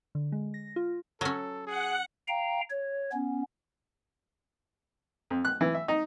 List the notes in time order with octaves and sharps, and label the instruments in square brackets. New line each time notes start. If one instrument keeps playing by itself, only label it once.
[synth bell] D3
G#3
A#6
F4
[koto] F#3 C#4 [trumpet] A4
[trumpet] G#4 [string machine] F#5
[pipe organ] F5 G5 A#5
C#5
B3 C#4
[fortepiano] F2
F#6
E3
E5
D#4